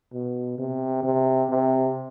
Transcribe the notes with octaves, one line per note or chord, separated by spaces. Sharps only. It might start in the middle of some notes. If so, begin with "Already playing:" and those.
B2
C3
C3
C3